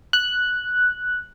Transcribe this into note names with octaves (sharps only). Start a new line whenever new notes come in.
F#6